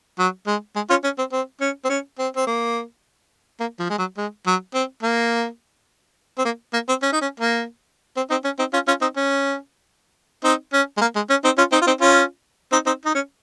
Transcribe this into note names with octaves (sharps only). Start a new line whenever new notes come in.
F#3
G#3
G#3
C#4 F4
C#4
C4
C4
C#4
C4
C#4
C4
C4
A#3
A#3
F3
G#3
F#3
G#3
F#3
C4
A#3
C4
A#3
A#3
C4
C#4
D#4
C#4
A#3
C4
C4 D#4
C#4
C4 D#4
C#4 F4
C#4 F4
C4 D#4
C#4
C4 D#4
C#4
G#3
A#3
G#3
C#4
C4 D#4
C#4 F4
C4 D#4
F4
C4 D#4
C#4 F4
C4 D#4
C4 D#4
D#4
C#4